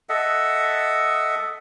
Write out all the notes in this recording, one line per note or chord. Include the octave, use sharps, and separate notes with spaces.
A4 D#5 E5 F#5